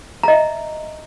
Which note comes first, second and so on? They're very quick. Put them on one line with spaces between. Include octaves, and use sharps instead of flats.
A#5 D#5 E5